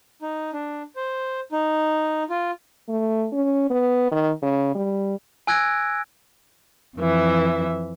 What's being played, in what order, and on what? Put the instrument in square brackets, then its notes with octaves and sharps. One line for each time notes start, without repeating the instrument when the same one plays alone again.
[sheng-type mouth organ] D#4
D4
C5
D#4
F4
[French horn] A3
C#4
B3
D#3
C#3
G3
[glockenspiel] G#5 E6 F#6 G#6 A#6 D7
[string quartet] F2 E3 E5